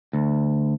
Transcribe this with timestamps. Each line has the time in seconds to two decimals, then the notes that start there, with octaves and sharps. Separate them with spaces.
0.13 D2